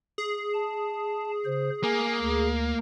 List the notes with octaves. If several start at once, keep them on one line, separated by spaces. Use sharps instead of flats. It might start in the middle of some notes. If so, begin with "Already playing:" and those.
G#4
A5
C#3 C5
A#3 G#5
D2